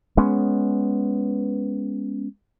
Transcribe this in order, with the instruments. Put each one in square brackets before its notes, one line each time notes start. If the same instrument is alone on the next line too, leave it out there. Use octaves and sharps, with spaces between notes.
[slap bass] G#3 B3 C#4